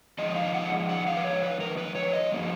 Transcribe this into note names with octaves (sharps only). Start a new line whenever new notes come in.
F3 G#3 D#4 D#5
F5
F#5
F#5
F5
B4
C#5
B4
A#4
B4
C#5
D#5
F3 A#3 D#4